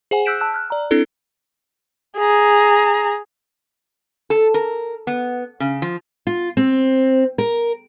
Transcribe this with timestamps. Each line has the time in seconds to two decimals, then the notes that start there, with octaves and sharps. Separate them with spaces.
0.11 G#4 C5 F#5 G#5
0.25 E6 F#6 G6 B6 D7 E7
0.41 A5 E6 F#6
0.54 F6 F#6
0.70 D5 A#5
0.91 C4 D4 E4 A4
2.18 G#4 A#5
4.30 A4
4.54 A#4
5.07 B3
5.60 C#3
5.82 F3
6.27 F4
6.57 C4
7.38 A#4